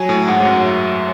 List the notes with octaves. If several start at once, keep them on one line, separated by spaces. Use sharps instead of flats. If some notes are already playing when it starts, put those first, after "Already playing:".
Already playing: F#3 G#5
A2
G#2 F#5
G#2
F#2
E5